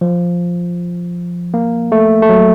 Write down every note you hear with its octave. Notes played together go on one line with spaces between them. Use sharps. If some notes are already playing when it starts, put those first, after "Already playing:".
F3
A#3
A3
A3
F#3